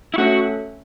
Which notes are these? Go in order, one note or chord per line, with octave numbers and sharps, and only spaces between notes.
E4
A3 C#4 F#4 A4 C#5 E5